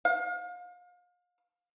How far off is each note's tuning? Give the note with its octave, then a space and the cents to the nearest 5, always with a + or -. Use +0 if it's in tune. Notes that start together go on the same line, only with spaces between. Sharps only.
F5 +35